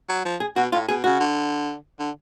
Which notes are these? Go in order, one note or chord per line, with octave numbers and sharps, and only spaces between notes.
F#3
F3
G#4
B2 F#4
A2 F4
B2 G#4
C#3 F#4
D3
D3